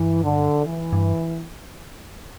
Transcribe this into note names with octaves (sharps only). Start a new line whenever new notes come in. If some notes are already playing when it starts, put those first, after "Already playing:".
Already playing: G2 E3
D3
E3
G2